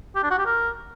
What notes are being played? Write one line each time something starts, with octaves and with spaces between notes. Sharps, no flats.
G4
D4
F#4
G4
A#4